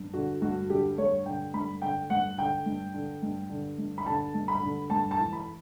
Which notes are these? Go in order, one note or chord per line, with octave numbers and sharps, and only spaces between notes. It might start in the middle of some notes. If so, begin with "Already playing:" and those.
Already playing: G2
D3 F#4
G2 F#4
D3 G4
G2 C#5
D3 G5
G2 B5
D3 G5
G2 F#5
D3 G5
G2
D3
G2
D3
G2
B5
D3 A5
G2
B5
D3
G2 A5
A5
E3
B5